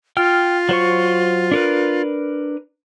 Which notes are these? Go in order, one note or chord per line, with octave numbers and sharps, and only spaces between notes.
F4 G5 F6
F#3 C5 C#6
D4 A#4 B4